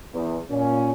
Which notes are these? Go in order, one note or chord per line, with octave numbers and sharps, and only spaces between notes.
E2
A#2 C#4